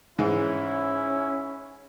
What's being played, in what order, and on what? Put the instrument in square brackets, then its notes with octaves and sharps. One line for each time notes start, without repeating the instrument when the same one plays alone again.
[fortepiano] G#2 E3 G#3 [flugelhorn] C#4 [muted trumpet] E4